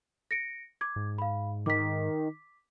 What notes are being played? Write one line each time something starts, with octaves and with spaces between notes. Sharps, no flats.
A#6 C#7 D7
D6 G#6
G#2
F5 B5
D#3 D6 B6